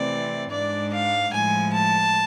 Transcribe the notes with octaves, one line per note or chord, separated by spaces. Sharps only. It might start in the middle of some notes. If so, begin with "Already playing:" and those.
Already playing: C3 E3 A3 C4 D5
G#2 G#3 D4 D5
F5
A2 F3 G#3 G#5
A5